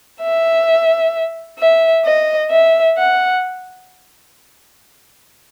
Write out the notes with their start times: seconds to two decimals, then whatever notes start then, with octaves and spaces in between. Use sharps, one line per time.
0.22 E5
1.59 E5
2.05 D#5
2.51 E5
2.98 F#5